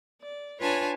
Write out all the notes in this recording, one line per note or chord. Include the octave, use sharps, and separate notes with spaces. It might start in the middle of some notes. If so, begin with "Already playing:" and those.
D5
D4 F4 B4 C#5 G#5 A5